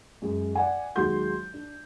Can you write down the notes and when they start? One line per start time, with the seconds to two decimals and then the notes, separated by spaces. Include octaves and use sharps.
0.22 F#2 G#3
0.55 D5 F#5 G#5
0.96 D#2 F#3 G#3 F#4 C6 G6
1.54 D4